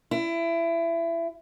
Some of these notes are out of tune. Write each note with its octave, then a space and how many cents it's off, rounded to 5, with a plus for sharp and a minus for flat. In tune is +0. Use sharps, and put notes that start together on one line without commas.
E4 +25